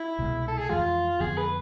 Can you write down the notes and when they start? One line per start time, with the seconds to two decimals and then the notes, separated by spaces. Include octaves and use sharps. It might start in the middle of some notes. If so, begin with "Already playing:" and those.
Already playing: E4
0.19 C2 B2 G#3
0.48 A4
0.58 G#4
0.69 F2 E3 G#3 F4
1.20 F2 D3 F3 B3 G#4
1.37 B4